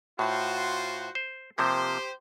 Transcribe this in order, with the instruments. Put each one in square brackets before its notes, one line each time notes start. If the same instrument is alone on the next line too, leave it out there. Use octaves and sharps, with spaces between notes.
[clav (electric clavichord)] A2 [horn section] F4 F#4 C5
[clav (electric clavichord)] C5
[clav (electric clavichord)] C3 F3 A#3 [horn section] G4 C5